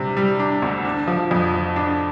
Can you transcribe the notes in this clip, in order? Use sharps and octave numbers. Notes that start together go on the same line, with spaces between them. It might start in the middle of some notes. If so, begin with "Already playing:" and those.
Already playing: C3 G3 D4
G3
D4
D2
D4
F3
F2
F3
D4